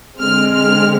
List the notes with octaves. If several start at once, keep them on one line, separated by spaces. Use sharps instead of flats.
D3 G#3 C4 F6
F6